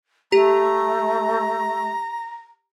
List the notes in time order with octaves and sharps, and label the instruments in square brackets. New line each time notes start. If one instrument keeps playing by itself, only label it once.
[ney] A3 [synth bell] G4 [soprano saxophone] A#5